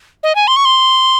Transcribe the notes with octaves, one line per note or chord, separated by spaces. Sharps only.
D#5
G#5
C6
C#6
C6